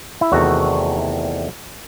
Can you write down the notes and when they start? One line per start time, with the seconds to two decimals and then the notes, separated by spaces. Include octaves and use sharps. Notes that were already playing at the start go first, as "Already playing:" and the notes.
0.21 E4
0.32 E2 C3 D#3 A3 F#4